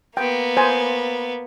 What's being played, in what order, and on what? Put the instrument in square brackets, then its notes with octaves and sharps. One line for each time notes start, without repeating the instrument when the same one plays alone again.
[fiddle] A#3 B3 [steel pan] G5
[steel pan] C5 G#5